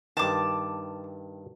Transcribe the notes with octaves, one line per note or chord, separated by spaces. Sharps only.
G2 D#3 A5 D6